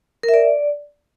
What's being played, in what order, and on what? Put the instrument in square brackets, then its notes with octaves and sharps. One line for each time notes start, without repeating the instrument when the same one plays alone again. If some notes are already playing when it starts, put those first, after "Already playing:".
[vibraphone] A#4
E5
D5